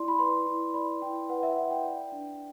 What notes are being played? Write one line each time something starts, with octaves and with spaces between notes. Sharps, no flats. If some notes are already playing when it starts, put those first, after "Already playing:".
Already playing: E4 D5 C6
B5
B4 C6
E4
D5 B5
E4 G5
B4 F#5
E5
E4 F#5
G5
D5
D4